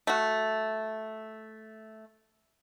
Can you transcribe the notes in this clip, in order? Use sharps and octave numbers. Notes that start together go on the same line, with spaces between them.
A3 F#4